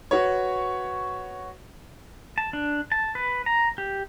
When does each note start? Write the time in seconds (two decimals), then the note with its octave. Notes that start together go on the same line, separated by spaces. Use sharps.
0.11 F#4 B4 C#5
2.38 A5
2.53 D4
2.92 A5
3.15 B4
3.46 A#5
3.78 G4